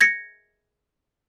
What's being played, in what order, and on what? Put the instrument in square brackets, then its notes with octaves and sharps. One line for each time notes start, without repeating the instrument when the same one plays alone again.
[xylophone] G#6 A#6 C#7